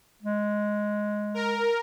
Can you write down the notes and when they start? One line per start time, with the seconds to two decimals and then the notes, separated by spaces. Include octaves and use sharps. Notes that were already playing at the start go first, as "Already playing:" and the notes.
0.22 G#3
1.34 A#4